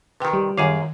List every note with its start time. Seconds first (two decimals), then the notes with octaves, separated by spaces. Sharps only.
0.20 C3 D#3 B4 G5
0.33 G3
0.58 F#2 D#3 G#4 F5